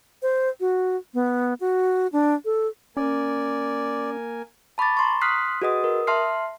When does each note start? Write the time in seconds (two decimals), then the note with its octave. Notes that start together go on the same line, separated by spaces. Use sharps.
0.22 C5
0.60 F#4
1.14 B3
1.60 F#4
2.13 D4
2.45 A4
2.97 A#3 C#4 A#4 D5 G#5
4.78 A5 B5 C#6 D6 A6
4.97 A#5 C6 C#6
5.21 C6 D#6 F6 F#6 B6 C7
5.62 F#4 G#4 B4 D#5 F#5 D#6
5.84 A#4 D#6
6.07 E5 A5 C6 F6 C7